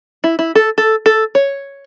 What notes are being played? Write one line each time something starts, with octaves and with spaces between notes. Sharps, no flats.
E4
E4
A4
A4
A4
C#5